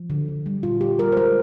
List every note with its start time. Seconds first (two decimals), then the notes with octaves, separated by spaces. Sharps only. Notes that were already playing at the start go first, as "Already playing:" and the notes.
Already playing: F3
0.10 D3
0.28 D3
0.46 G3
0.63 A#2 F4
0.81 A#2 G4
0.98 G3 A#4
1.12 C5
1.17 G#3 A#4